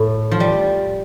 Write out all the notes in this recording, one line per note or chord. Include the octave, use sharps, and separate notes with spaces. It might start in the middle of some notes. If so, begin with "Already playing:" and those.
Already playing: A2
F3
G3